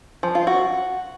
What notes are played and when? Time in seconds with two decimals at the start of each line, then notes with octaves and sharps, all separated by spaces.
0.23 F3
0.35 F4
0.47 F#4